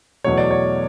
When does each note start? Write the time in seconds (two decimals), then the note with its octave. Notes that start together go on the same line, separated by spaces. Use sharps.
0.24 E2 B2 F#3 A3 C#5
0.38 D5
0.51 C#5